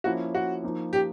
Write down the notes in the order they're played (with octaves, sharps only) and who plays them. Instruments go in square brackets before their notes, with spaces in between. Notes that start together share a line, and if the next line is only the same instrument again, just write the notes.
[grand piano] F3 A#3 C#4 E4 [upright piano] F#4
[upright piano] F#4
[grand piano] F3 A#3 D#4
[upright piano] G4